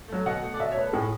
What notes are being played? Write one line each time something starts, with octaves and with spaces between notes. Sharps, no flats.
F#3 A3
B2 F#5
A3
D5
B2 E5
C#5
A3 B4
A4
A2 G#4